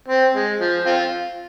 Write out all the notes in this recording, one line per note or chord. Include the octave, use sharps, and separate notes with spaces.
C4
G#3
F3
C4 F4